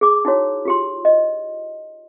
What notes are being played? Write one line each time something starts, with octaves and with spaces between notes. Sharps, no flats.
G#4 D6
D#4 E4 F#4 C#5
F4 G4 C6
D#5